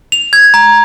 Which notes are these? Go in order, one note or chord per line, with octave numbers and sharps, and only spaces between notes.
F7
G#6
A#5